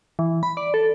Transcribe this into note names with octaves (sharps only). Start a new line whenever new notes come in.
E3
B5
D5
A4